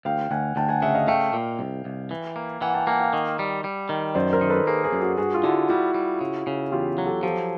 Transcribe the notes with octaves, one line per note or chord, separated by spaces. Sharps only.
D2 F5 G5
D2 F#5 G#5
D2 G5 A5
F#5 G#5
C#3 E5 F#5
D#5 F5
A3 F5 G5
A#2
C2
C2
E3
A#3
E3 F#5 G#5
G5 A5
A#3 F#5 G#5
F5 G5
D#3
G3
G3
D#3
F#2 C5 D5
A#4 C5
D#3
A4 B4
A#3 G#4 A#4
G#4 A#4
F#2
F#4 G#4
G2 F#4 G#4
F4
D3 E4 F#4
G3 E4 F#4
G3
C#3
C#3
E2 F4 G4
F#3
G4 A4
F3 G4 A4